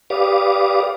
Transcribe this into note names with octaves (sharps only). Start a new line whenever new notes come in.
G4 B4 D5 F5 D6 D#6